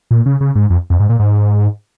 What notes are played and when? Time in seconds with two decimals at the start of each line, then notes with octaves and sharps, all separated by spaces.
0.11 A#2
0.26 C#3
0.41 C#3
0.55 G#2
0.70 F2
0.90 F2
1.00 G#2
1.09 A#2
1.19 G#2